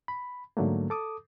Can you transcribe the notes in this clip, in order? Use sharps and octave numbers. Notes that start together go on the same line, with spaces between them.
B5
G#2 D3 F#3 A3 A#3
A4 D6 D#6